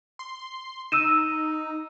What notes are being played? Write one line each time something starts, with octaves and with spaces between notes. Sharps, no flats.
C6
D#4 E6 D#7 E7